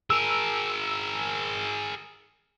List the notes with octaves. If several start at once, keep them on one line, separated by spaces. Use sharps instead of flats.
G#4 A#4 E6